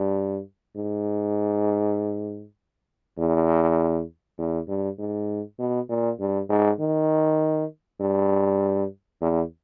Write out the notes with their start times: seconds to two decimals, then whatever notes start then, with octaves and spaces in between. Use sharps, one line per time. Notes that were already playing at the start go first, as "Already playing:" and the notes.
Already playing: G2
0.76 G#2
3.18 E2
4.38 E2
4.68 G2
4.99 G#2
5.59 B2
5.89 A#2
6.20 G2
6.49 G#2
6.80 D#3
8.00 G2
9.21 E2